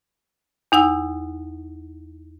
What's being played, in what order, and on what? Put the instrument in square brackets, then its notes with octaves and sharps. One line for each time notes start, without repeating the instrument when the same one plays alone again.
[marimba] E2 D#4 F#5 E6